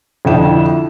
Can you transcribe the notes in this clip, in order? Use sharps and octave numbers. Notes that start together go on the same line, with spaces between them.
F2 D3 D4 E4 G5 E7